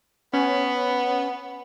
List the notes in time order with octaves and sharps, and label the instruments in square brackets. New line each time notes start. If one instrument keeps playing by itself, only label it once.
[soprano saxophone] B3 [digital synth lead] C#4